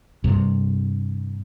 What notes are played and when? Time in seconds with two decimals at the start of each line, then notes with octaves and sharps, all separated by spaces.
0.24 G2 C3